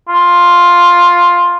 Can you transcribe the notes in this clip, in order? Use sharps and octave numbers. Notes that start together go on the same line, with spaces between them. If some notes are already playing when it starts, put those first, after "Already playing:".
F4